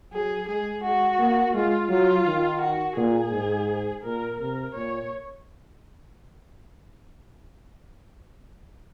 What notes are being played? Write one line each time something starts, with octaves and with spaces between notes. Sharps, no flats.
F#3 G#4
G#3 G#4
G#3 F#4
A#3
G#3 F4
F#3 F4
D#3
F#4
A#2 G#4
G#2
A#2 A#4
C3 A#4
A#2 C#5